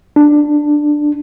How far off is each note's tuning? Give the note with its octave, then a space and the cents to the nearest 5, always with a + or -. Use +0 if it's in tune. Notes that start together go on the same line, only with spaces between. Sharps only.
D4 +10